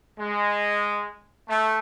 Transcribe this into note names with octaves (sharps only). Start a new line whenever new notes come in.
G#3
A3